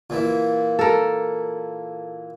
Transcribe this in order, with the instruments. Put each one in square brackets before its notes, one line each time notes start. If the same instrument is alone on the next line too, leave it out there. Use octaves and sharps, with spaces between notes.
[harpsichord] A#2 E3
[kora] A4 A#4